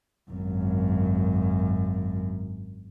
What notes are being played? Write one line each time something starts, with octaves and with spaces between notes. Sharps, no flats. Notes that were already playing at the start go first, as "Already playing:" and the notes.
G#1 F#2